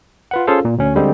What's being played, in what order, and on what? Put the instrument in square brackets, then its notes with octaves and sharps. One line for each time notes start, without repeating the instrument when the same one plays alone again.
[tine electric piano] F4 B4 F#5
C#4 F4 G#4 A4 C5 F5
A#2
D2 C#4
D3 G3 G#3 C4